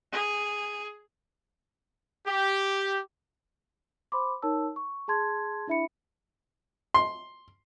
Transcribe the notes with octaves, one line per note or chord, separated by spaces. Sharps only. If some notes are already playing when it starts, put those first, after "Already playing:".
G#4
G4
C5 B5 C6 D6
D#4 A#4 C#5 A5 E6
C#6
G#4 A5 C6 G#6
D4 E4 E5 B5 C#7
C6